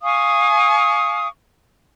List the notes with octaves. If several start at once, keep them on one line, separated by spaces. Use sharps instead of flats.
F5 G#5 C#6 D#6